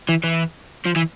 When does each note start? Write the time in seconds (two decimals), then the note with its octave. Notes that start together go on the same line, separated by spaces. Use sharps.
0.09 E3
0.24 E3
0.85 F3
0.96 E3